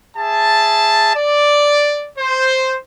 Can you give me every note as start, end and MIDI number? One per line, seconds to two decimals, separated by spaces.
0.17 1.14 68
0.17 1.14 76
0.17 1.14 81
1.16 2.09 74
2.18 2.76 72